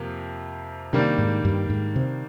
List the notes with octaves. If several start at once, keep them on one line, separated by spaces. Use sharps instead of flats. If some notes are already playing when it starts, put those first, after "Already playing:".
Already playing: F2 C3 F3 A#3
C3 D#3 G3 A#3 D4
G#2
G2
G#2
C3